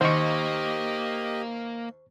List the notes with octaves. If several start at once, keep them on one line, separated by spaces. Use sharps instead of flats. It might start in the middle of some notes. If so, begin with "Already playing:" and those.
D#2 A#3 G4 C5 D#5 C#6